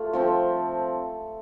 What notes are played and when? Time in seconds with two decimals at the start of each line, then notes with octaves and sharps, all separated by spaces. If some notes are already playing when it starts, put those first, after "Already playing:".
Already playing: A3 F4 G4
0.13 F3 C4 A4 C5